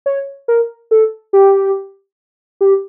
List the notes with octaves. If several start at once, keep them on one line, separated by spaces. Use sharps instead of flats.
C#5
A#4
A4
G4
G4